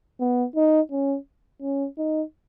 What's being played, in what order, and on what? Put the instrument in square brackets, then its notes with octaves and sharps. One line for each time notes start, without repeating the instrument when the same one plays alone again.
[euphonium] B3
D#4
C#4
C#4
D#4